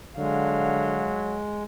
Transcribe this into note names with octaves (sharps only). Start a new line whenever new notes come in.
D3 F#3 G#3 F5